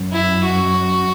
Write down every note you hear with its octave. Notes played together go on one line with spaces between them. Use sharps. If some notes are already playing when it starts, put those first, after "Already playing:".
Already playing: F#2
E4
F#4